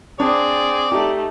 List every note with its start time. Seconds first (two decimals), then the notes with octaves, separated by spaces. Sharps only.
0.20 C4 D4 G#4 D5
0.92 A3 D#4 G4